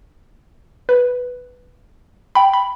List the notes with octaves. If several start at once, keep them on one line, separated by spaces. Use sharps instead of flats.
B4
G5 B5
B5